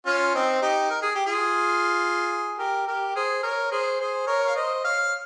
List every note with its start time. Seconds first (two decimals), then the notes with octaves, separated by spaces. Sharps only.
0.06 C#4 F4
0.35 C4 D#4
0.62 D#4 G4
0.90 A#4
1.02 G#4
1.15 G4
1.26 F4 G#4
2.59 G4 A#4
2.87 G4 A#4
3.16 G#4 C5
3.43 A#4 C#5
3.71 G#4 C5
4.00 G#4 C5
4.27 A#4 C#5
4.47 F5
4.55 C5 D#5
4.84 C#5 F5